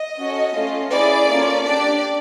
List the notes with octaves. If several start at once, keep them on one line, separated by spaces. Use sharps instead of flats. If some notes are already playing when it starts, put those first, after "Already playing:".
Already playing: D#5
C#4 F#4 A4
A3 C#4 F4
C#4 E4 G#4 D5
A#3 C#4 F4 A4
D4 G4 D5